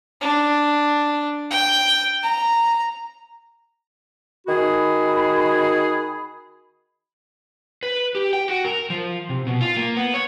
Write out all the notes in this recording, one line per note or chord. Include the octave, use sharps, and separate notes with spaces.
D4
G5
A#5
D#3 F#4 G#4 B5
B4
G4
G5
F#4
A#4
F3
C3
B2
F4
A#3
B3
C#5